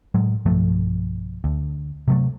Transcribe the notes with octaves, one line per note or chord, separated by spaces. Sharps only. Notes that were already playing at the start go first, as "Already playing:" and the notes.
A2 F#3 G#3
B1 G2 F3 A3
D2
C3 F#3 A3